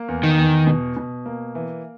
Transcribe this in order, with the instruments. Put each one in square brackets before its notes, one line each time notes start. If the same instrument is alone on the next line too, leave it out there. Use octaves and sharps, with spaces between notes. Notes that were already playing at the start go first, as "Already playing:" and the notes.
Already playing: [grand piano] A#3
E2
[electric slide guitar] D#3
[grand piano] E2
B2
B2
A#3
E3